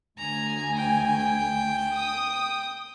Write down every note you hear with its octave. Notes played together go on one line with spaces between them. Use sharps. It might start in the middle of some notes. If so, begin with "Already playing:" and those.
D2 G#5 A#5
G5
D#6